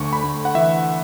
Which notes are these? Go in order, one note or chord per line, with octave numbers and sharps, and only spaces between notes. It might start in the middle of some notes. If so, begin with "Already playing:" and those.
Already playing: D2 D3 C#6
B5
D2
F#5
E3 E5